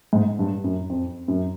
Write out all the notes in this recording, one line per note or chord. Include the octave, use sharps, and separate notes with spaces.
G#2
G2
F#2
F2
F#2